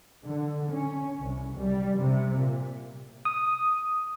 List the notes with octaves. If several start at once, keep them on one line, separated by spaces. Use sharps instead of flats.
D3
C#4
C2
G3
C3
A#2
D#6